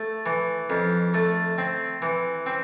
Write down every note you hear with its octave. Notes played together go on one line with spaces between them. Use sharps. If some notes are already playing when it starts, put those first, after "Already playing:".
Already playing: A3
E3
F2
A3
C4
E3
C4